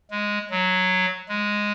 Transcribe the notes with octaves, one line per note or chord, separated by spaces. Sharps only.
G#3
F#3
G#3